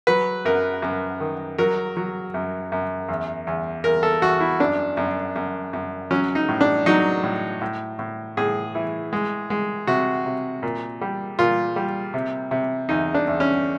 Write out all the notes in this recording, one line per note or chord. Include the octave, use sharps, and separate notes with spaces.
F#3 B4
F#2 A#4
F#2
D#3
F#3 A#4
F#3
F#2
F#2
E2
E2
E2 A#4
A4
E2 F#4
E4
F#2 D4
F#2
F#2
F#2
F#3 C#4
D#4
A2
D4
F#3 D#4
A2
A2
A2
A2 G#4
E3
G#3
G#3
C3 F#4
C3
A#2
G3
A#2 F4
G3
C3
C3
E2 D#4
D4
E2
C#4